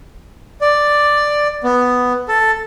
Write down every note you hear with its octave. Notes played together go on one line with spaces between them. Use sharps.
D5
B3
A4